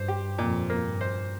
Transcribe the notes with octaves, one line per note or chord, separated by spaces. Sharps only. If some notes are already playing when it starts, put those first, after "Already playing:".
Already playing: G2 C5
G4
F2 A#2
A#3
G2
C5